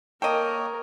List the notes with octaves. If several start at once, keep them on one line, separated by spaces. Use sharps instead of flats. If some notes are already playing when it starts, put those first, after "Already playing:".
A#3 A4 A#4 C#5 D#5 G5 D#7